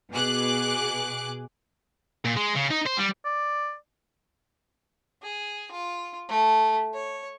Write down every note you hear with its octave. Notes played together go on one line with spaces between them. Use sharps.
B2 G#4 D6 F#6
A#2
G#3
C#3
D#4
C5
G3
D5
G#4
F4
A3
C#5